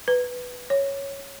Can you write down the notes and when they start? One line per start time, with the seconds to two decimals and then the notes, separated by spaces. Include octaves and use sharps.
0.08 B4
0.70 C#5